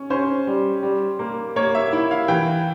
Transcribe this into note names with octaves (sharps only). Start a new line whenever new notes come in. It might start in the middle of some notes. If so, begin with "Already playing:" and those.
Already playing: C#4
C#4 C5
G3
G3
A#3
A#3 C#5
E5
E4
F5
E3 G5